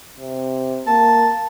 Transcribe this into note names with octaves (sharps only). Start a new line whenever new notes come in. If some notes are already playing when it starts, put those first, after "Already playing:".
C3
A#3 A5